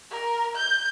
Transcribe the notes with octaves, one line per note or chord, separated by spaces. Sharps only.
A#4
G6